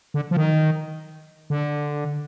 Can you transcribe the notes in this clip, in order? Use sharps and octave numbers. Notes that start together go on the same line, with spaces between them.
D3
F3
D#3
D3